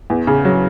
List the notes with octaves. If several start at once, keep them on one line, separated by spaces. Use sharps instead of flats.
E2
C#3
F#3